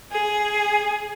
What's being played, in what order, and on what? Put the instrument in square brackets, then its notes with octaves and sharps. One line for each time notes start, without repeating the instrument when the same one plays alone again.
[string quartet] G#4